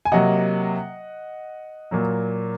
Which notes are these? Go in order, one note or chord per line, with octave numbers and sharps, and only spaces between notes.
G#5
C3 F#3 A#3 D#5 F#5
A#2 F#3 A#3